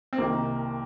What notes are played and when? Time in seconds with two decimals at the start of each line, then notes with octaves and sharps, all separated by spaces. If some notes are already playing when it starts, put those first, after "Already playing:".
0.13 C4
0.18 C2 C3 D#3 A#3